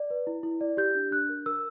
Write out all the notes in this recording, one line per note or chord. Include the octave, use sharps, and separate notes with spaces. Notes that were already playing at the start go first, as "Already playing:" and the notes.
Already playing: D5
B4
E4
E4
D5
G4 G6
D4
D4 F#6
A#4
A#4 E6